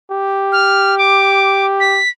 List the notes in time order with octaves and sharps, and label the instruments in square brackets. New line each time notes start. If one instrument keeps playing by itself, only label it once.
[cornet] G4
[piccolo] F6
D6
B6